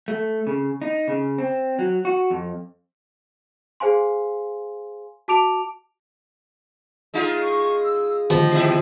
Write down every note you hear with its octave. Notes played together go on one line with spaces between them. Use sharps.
A3
C#3
D#4
C#3
C4
F#3
F#4
F2
G#4 C5 F5 G#5 C6
F#4 A5 D6 D7 F7
G#3 D#4 F4
C#6
E6
A2 D3 D#3 F3 G4 D#5
B2 E4